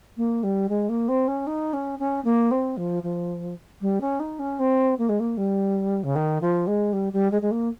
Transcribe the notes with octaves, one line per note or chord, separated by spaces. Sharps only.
A#3
G3
G#3
A#3
C4
C#4
D#4
C#4
C#4
A#3
C4
F3
F3
G3
C#4
D#4
C#4
C4
A#3
G#3
A#3
G3
C#3
D#3
F3
G#3
G3
G3
G#3
G#3
A#3